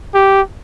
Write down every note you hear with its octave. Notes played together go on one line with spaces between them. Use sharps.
G4